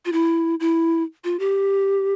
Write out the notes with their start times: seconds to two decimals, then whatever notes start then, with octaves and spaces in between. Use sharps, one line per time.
0.05 F4
0.12 E4
0.60 E4
1.24 F4
1.39 G4